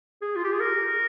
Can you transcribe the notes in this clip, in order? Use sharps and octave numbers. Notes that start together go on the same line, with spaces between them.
G#4
F4
G4
G#4
A#4